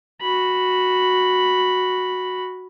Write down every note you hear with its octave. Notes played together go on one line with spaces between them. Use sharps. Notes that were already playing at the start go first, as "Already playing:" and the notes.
F#4 B5